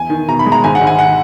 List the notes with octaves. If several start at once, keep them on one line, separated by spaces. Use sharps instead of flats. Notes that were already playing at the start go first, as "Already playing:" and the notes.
Already playing: E2 G#5
D#3
B2 A#5
B5
G#3
A#5
G#1 G#5
F#5
G#1
G#5
F#5